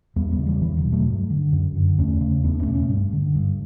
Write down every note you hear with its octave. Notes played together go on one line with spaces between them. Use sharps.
E2 G3 B3
G3 B3
C#3
E3 G3
E2 E3
D3 F#3
B2
F#3 A3
G2
D3
F#2
D3
E2 A3 C#4
C#3
E2 B3 D4
A3 C#4
B2
A3 C#4
G2
D3
G2